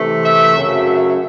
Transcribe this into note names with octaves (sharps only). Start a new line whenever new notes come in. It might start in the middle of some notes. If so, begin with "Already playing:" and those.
Already playing: C3 E3 A3
E5
F#2 C#3 F#3 A3